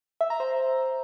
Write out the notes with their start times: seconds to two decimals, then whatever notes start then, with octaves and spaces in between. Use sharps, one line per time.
0.21 E5
0.30 A#5
0.40 C5